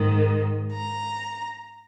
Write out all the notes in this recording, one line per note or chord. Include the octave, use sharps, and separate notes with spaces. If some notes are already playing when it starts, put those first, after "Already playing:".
Already playing: G#2 D#3
A#5